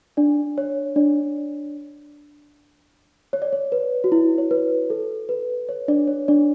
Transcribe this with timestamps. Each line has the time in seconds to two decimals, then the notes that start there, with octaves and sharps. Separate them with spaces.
0.17 D4 D5
0.58 C#5
0.96 D4 D5
3.33 C#5
3.42 D5
3.53 C#5
3.72 B4
4.04 F#4
4.12 E4
4.38 C#5
4.51 B4
4.90 A4
5.29 B4
5.69 C#5
5.88 D4 D5
6.07 C#5
6.28 D4 D5